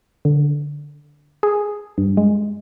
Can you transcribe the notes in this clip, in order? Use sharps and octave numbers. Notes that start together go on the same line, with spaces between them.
D3
G#4
G2
G#3